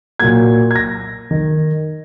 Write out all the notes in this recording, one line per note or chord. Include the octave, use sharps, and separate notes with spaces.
A#2 F#3 A#3 G#6
G#6
A#6
D#3